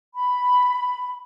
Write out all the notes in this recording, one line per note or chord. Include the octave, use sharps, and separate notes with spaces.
B5